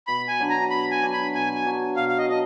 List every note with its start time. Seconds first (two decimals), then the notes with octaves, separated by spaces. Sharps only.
0.07 B2 B5
0.28 G#5
0.40 F#3 D4 F#4
0.50 A#5
0.70 B2 B5
0.91 G#5
1.02 F#3 D4 F#4
1.13 B5
1.34 B2 G#5
1.55 G#5
1.65 F#3 D4 F#4
1.96 B2 F5
2.09 F5
2.18 D#5
2.29 F#3 D4 D#5